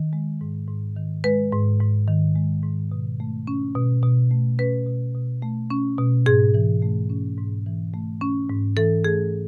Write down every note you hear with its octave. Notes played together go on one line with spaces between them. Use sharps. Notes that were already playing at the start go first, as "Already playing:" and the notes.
Already playing: D#3
G#3
G#2
G#2
D#3
G#3 B4
G#2
G#2
D#3
G#3
G#2
B2
A3
C#4
B2
B2
A3
C#4 B4
B2
B2
A3
C#4
B2
G#2 G#4
E3
A3
C#4
G#2
E3
A3
C#4
G#2
E3 A4
A3 G#4